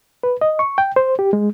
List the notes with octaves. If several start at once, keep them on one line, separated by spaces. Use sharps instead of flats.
B4
D#5
C#6
G5
C5
G4
G#3